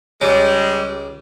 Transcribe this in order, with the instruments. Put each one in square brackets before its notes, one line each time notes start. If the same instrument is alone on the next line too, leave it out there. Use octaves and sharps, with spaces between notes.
[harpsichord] C#2 C#4 D6 [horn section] G3 G#3